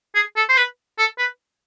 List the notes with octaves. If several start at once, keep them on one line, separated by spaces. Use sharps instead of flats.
G#4
A4
C5
B4
A4
B4